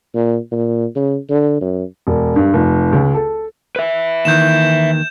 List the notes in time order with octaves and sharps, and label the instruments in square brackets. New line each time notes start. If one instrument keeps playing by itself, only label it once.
[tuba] A#2
A#2
C#3
D3
F#2
[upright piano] E1
G2
F1
C#2
A4
[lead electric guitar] B4 E5
[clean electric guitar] D#2 D#3 E3 [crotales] G6 E7